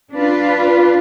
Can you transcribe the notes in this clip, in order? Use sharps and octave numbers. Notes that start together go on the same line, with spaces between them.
D4 F4 B4